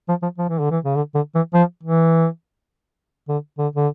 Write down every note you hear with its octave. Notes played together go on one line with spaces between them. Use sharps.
F3
F3
F3
E3
D3
E3
C#3
D3
D3
E3
F3
E3
D3
D3
D3